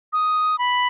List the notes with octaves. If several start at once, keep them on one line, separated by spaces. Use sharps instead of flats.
D#6
B5